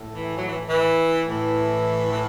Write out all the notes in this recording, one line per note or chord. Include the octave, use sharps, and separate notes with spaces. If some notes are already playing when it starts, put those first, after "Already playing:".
Already playing: A2
E3
F#3
E3
E3
A2 E3
E3